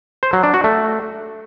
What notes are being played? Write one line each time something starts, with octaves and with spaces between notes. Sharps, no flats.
C5
F#3
D4
F#4
A3